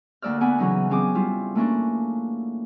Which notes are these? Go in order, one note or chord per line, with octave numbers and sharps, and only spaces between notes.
D2 A#3 D5 E6 F6
B3 D5 F#5 G#5 B5
C#3 E3 F#3 C#4 D#4
F#3 C4 C#4 G#4 D6 D#6
G3 E4 F4
A3 A#3 C#4 D4